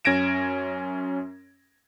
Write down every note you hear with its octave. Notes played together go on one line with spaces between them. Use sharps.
F#2 C#4 G#6 A#6 D7 E7